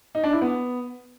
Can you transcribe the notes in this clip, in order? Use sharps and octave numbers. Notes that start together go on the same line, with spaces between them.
D#4
D4
E4
B3